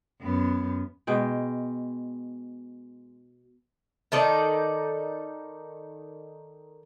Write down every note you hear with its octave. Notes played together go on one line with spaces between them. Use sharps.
F#2 B3
B2 G#3 G5
D#3 D#4 A4 D5